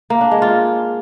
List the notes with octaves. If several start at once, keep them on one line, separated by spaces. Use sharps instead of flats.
A#3
D4
G#3
F4